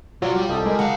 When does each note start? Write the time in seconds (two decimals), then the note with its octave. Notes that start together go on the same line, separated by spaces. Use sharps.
0.22 B2 F#3 F4 D5
0.36 G3 G4
0.49 C2 E4 A4 D#5
0.66 G#3 A#4
0.79 C#2 F5 F#5 A#5 C#7